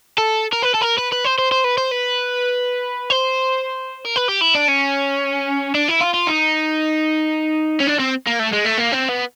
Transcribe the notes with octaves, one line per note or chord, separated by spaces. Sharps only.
A4
A#4
B4
A4
A#4
B4
B4
C5
C5
C5
B4
C5
B4
C5
A#4
B4
G4
E4
D4
C#4
D4
E4
F4
F4
D#4
C#4
D4
C4
A#3
A3
G#3
A3
A#3
C4
B3